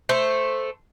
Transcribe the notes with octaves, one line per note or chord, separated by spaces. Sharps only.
A3 C5